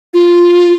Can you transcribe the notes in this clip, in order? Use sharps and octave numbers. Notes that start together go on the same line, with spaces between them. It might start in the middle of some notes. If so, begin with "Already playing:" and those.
F4